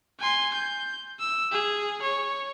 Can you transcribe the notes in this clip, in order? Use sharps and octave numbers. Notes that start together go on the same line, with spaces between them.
G#5 C6
G6
E6
G#4
C#5